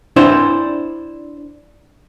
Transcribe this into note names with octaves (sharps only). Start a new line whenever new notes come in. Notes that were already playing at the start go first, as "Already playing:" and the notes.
D4 E4 C5